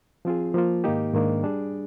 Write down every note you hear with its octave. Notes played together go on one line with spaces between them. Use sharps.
F3 C4 F4 G#4
F3 A#3 F4
G#2 D#3 A#3 D#4 G4
G#2 D#3 A#3 D4
G3 D4 G#4